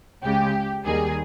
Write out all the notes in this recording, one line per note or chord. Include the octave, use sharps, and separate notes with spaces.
C#2 C#3 G#3 G4
D#2 D#3 G3 G#4